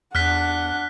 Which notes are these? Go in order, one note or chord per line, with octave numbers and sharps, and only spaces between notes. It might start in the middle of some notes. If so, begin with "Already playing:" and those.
E2 D4 F#5 F6 F#6 B6